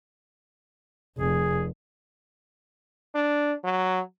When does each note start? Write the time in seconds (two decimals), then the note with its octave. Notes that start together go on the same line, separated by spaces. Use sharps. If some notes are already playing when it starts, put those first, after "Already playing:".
1.18 F1 G#4
3.15 D4
3.64 F#3